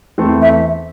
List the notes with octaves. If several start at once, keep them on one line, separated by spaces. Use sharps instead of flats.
E2 E3 A3 C4 A4
E5